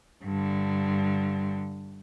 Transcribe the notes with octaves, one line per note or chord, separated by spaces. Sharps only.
G2 D3